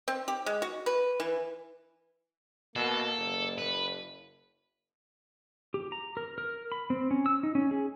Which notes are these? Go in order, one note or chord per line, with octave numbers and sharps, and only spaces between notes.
C4
G4
G#3
F#4
B4
E3
B2 A#3 A4
F#1
B4
G4
A#5
A#4
A#4
B5
C4
C#4
E6
D#4
C#4
G#4